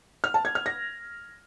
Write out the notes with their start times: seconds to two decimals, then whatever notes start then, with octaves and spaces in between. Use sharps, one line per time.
0.24 F6
0.34 A5
0.45 G#6
0.55 F6
0.66 A#6